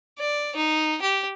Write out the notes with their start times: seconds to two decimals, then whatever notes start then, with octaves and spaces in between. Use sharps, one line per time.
0.19 D5
0.56 D#4
1.02 G4